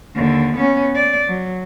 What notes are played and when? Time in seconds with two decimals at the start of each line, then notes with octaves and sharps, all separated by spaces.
0.16 D#2 D3
0.57 B3 C#4
0.96 D5
1.28 F#3